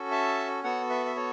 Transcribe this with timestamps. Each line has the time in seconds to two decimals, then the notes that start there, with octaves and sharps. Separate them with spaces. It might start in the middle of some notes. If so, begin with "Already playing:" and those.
Already playing: C#4 F#4 A4
0.11 E5 A5
0.63 B3 F#4 A4 C#5 F#5
0.90 B4 E5
1.06 E5
1.16 A4 C#5